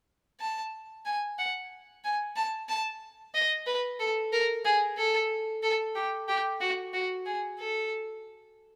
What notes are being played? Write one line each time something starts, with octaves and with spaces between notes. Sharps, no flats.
A5
G#5
F#5
G#5
A5
A5
D#5
B4
A4
A#4
G#4
A4
A4
G4
G4
F#4
F#4
G#4
A4